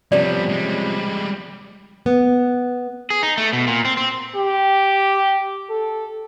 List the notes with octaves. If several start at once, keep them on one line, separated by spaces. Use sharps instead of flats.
C3 F3 G3 B3 C#4 D5
G3 G#3
B3
G#4
D#4
A3
B2
A#2
C4
C4
G4
A4